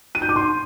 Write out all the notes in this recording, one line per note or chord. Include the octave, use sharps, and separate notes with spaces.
D#7
G6
D6
C6